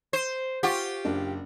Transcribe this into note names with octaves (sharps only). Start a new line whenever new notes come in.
C5
F4 G4 F#5 C#6
F#1 D4